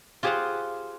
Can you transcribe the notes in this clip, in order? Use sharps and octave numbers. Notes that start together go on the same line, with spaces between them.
F4 G4 G#4 C5 F5 F#5